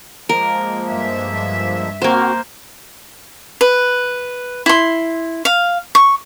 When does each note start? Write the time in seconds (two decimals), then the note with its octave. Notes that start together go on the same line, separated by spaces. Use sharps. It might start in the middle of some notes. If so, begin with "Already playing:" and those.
0.29 F3 G#3 A#3 A#4
0.87 G2 E5
2.02 A#3 C4 F#4 C5
3.61 B4
4.66 E4 C6
5.45 F5
5.95 C#6